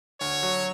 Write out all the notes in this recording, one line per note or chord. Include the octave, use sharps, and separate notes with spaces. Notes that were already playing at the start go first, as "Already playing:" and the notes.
D2 C#5
F#3